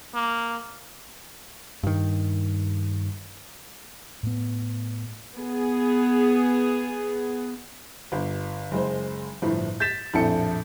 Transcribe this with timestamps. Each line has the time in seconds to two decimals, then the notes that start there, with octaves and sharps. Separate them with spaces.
0.14 A#3
1.83 G2 D#3
4.23 A2 B3
5.36 B3 G#4
8.12 G1
8.71 F#1 G#3 C5
9.42 G1 A2 F3
9.80 G6 A6 B6 E7
10.14 A#1 F2 A2 A4 C#7